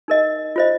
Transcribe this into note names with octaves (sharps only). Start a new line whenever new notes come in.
D#4 A#4 D#5
F4 C5 D#5